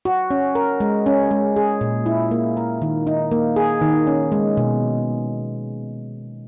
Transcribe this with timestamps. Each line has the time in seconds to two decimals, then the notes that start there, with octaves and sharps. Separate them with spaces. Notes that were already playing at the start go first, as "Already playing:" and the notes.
0.05 F#4
0.31 C#4
0.55 A#4
0.80 G#3
1.06 C#4
1.31 G#3
1.56 G#4
1.81 A#2
2.06 E4
2.31 A#3
2.57 A#4
2.82 D#3
3.07 D#4
3.32 A#3
3.56 G#4
3.82 D#3
4.07 C#4
4.32 G#3
4.57 B2